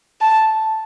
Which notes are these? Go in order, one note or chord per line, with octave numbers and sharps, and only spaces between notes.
A5